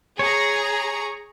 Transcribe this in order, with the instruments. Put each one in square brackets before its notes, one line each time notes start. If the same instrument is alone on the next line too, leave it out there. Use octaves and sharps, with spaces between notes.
[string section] G#4 A#5 [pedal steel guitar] C#5